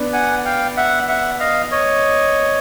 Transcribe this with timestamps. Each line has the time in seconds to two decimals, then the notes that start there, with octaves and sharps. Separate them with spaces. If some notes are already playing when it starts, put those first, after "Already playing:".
Already playing: B3 D4
0.13 F#5 G#5
0.45 F5 G5
0.77 E5 F#5
1.08 E5 F#5
1.40 D#5 F5
1.72 C#5 D#5